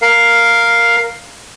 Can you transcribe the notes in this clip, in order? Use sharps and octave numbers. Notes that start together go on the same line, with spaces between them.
A#4 F5